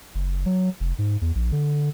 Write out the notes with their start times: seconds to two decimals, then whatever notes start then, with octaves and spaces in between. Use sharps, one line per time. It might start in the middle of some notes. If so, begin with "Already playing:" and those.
0.15 F#1
0.46 F#3
0.80 F1
0.98 G#2
1.21 E2
1.35 A#1
1.52 D3